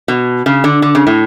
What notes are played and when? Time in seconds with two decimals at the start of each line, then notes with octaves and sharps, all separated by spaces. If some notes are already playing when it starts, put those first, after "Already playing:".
0.08 B2
0.46 C#3
0.64 D3
0.82 D3
0.95 C#3
1.07 A2